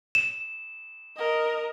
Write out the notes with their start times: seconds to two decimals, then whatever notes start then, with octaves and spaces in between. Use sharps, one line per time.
0.15 E7
1.17 A#4 D#5